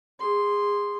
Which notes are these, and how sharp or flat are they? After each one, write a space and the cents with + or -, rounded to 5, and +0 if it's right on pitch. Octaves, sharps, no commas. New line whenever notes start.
G#4 -25 C6 +0